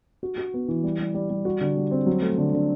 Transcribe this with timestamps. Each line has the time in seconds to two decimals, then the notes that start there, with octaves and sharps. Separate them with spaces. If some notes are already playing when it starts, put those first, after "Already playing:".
0.23 F#4
0.38 F#4
0.54 B3
0.68 E3
0.83 G3
1.00 G3
1.14 G3
1.30 G3
1.45 F#4
1.61 D3
1.77 G3
1.91 C4
2.06 F#3
2.22 A3
2.38 D3
2.54 D3